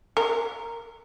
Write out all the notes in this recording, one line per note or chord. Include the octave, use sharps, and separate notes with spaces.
A#4